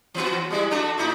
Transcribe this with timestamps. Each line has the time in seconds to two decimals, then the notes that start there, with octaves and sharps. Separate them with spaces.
0.14 E3 B3 F#4
0.50 G3 G#3 E4
0.71 A3 D4 F#4
0.98 A2 D#4 E4